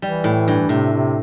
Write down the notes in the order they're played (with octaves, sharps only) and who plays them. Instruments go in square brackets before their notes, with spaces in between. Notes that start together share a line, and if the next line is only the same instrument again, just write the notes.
[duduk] E3 [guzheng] G3
[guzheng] A2
G2
[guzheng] A2 [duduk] C3
[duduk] C3